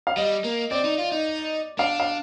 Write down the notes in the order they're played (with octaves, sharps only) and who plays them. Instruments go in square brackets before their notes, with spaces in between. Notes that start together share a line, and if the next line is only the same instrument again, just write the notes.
[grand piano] F5
[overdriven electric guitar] G3 [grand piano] D#5
[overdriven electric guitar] A#3
[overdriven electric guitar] C4 [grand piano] D5
[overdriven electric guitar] D#4
F4
D#4
[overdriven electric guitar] D4 [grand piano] F5
[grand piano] F5